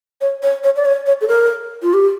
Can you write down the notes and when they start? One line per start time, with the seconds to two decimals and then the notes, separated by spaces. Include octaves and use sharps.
0.21 C#5
0.42 C#5
0.64 C#5
0.76 D5
0.85 C#5
1.06 C#5
1.21 A4
1.28 A#4
1.82 F4
1.93 G4